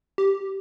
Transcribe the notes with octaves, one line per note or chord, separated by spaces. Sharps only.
G4